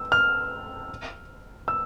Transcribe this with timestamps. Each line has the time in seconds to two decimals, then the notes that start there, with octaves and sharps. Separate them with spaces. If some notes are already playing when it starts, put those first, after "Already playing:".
Already playing: E6
0.12 F6
1.68 E6